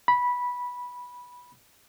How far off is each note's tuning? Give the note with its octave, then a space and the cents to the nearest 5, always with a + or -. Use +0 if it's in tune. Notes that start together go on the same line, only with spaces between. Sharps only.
B5 -10